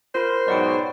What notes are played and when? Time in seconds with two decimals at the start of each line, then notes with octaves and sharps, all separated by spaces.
0.15 F4 A#4 C5 B5
0.48 G#2 B2 F#3 D5 F#5 G5